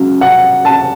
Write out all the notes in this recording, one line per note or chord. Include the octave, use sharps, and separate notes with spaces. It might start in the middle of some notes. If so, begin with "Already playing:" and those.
Already playing: C#2 C#3 F#3
F#5
A5